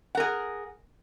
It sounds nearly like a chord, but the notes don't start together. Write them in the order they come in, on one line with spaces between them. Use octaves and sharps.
F#5 A#4 G#4